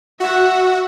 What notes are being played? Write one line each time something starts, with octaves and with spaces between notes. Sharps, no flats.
F#4 E5 F#5